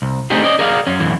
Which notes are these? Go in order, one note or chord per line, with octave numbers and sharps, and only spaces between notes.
C2
A3 C4 D4 D#4 G4 G#4
C#4 D5 D#5
G#4 A#4 D5 F5
F#2 C#4
B1 F#2 D3 E3